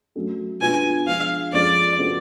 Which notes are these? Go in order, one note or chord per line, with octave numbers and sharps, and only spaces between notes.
F#3 A3 C#4 F#4 A4
B2 G#3 D4 F4 B4 G#5
F3 G#3 D4 G#4 F5
F3 G#3 C#4 F4 A4 D5
C#3 F3 B3 F#4 A4